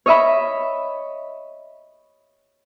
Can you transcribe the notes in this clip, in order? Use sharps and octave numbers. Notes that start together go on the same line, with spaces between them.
C#5 D#5 E5 B5